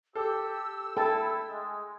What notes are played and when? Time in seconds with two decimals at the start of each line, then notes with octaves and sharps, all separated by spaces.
0.15 G4 A4 E6
0.97 E4 A4 G5 A5
1.50 G#3